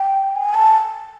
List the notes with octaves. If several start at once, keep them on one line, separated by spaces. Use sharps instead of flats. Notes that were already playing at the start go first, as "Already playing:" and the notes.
Already playing: G5
G#5
A5